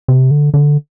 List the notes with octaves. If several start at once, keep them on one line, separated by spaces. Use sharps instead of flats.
C3
D3
D3